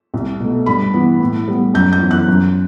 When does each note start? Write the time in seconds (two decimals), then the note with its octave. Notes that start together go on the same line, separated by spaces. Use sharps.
0.14 C2
0.40 B2 A3
0.66 G2 B5
0.94 E3 B3
1.20 A2
1.48 G3 B3
1.74 F#2 G6
1.93 G6
2.01 E3 B3
2.11 F#6
2.28 F#2